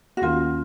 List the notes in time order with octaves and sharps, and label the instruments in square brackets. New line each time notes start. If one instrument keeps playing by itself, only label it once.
[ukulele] F#4
[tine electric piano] D#2 D#3 A#3 C#4 [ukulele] F4